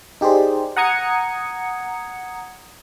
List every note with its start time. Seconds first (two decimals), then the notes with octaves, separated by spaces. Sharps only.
0.21 D#4 G4 G#4 C5 D5
0.77 F#5 A#5 D#6 G#6 C#7